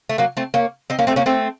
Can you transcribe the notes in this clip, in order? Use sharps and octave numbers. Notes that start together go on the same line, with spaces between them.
A3
F#3 A#3
A3 C4
A#3 C#4
C4 D#4
A#3 C#4
A3 C4
A#3 C#4
A3 C4